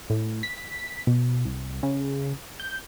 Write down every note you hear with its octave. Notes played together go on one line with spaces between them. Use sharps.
A2
B6
B2
C2
C#3
G6